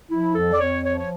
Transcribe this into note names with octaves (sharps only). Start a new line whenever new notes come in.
F3 E4
F2 A4
D5
F2 C#5
F3 C#5
C#5